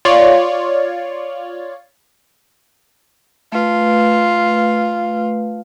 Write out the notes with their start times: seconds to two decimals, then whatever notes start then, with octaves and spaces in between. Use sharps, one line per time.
0.05 F4 C#5 D5
3.52 A3 F4 B4